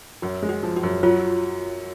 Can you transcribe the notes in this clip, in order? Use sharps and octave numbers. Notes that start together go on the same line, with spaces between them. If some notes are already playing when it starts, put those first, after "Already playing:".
F#2 F#4
G#3
F#4
F3
F#4
F#2
F#3 F4